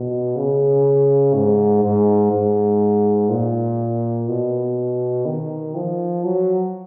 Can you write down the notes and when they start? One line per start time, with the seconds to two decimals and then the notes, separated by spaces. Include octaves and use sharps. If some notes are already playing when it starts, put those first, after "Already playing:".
Already playing: B2
0.36 C#3
1.34 G#2
1.84 G#2
2.32 G#2
3.30 A#2
4.28 B2
5.25 D#3
5.75 F3
6.24 F#3